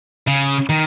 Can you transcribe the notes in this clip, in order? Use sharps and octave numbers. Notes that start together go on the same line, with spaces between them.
C#3
D#3